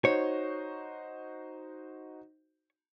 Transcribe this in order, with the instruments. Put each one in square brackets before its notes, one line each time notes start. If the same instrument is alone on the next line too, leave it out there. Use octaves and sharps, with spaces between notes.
[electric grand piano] D#4 F#4 C5 [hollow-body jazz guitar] C#5